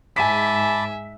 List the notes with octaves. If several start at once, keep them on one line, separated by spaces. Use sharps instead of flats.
G#2 E5 G#5 A5 B5 D6 B6